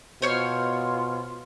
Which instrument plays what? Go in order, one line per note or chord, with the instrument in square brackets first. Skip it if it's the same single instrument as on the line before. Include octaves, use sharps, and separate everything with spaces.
[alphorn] B2 [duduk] F4 [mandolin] C5 C#5 F6